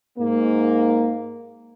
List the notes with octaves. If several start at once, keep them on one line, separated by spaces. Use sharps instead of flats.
G#2 A#3